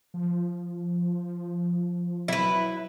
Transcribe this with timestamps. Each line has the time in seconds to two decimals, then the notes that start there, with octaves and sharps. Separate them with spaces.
0.14 F3
2.28 F#3 E4 B4